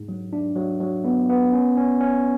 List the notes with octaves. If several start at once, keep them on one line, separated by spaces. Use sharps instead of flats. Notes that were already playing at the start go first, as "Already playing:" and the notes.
Already playing: G#2
F#3
D4
F#3
F#3
B3
B3
C#4
C#4
C#4